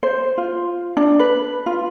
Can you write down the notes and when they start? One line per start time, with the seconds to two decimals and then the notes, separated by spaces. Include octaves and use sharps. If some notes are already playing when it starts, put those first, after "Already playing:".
0.03 C5
0.38 F4
0.97 D4
1.19 B4
1.66 F4